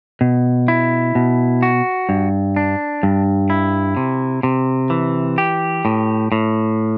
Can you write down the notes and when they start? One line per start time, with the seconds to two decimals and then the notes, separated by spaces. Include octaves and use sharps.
0.21 B2
0.68 E4
1.15 B2
1.63 F#4
2.09 G2
2.56 D4
3.03 G2
3.50 E4
3.97 C3
4.43 C3
4.90 E3
5.38 G4
5.85 A2
6.32 A2